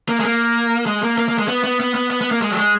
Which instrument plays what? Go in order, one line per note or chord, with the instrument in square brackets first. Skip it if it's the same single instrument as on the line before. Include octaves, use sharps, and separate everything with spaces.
[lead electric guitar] A#3
G#3
A#3
G#3
A#3
A#3
A#3
G#3
B3
B3
B3
B3
B3
B3
A#3
G#3
F#3
G#3